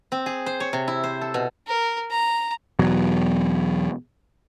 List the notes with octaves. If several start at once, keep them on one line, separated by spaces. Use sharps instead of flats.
C4
G#4
C5
C#5
C3
E4
C5
A4
B2
A#4
A#5
E2 B2 F#3